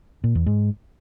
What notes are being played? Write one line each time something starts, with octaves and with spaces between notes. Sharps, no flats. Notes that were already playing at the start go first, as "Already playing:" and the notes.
A#2
E2
G#2